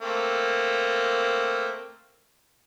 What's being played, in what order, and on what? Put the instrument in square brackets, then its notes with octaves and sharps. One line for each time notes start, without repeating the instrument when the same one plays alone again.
[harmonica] A3 A#3 C4